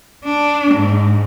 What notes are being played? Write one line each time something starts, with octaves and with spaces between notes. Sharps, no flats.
D4
G#2